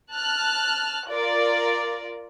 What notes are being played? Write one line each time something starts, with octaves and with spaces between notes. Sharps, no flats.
A5 F6 F#6
F4 A#4 D5